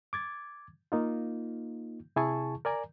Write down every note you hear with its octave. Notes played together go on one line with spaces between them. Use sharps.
D6 G#6 A6
A#3 D#4 F4
C3 E4 G#4 G#5 A5 C#6
A#4 D5 G#5 A#5